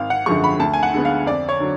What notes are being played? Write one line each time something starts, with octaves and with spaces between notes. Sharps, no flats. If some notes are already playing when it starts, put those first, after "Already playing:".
Already playing: G#1 F5
F#5
F#2 D3 F3 G#3 C#6
B5
D2 A5
G#5
F#5
D3 G#3 B3
F5
F2 D5
C#5
D3 F#3